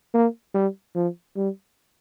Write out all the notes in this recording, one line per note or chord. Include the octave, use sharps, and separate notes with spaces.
A#3
G3
F3
G3